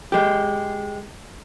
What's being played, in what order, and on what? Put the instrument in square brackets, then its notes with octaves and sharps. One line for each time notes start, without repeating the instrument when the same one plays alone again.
[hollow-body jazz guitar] G#3 G4